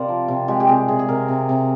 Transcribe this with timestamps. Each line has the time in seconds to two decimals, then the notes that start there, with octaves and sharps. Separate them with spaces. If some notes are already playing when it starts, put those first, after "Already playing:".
Already playing: C3 A#4 C5 D5 F5
0.09 F3
0.28 C3
0.48 G#3 G4
0.60 G4
0.68 C3 G#4
0.88 C3 G#4
0.99 G#4
1.09 C3 A#4
1.28 C3
1.49 C3